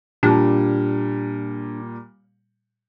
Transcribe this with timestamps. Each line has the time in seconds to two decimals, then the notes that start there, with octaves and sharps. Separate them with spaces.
0.23 A#2 G3 D4